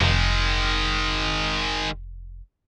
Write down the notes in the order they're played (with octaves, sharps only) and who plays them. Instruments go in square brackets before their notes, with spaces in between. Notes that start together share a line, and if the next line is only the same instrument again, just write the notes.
[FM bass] F1 [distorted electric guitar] D#3 G#3